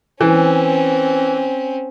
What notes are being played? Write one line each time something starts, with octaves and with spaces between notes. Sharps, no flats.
E3 C4 C#4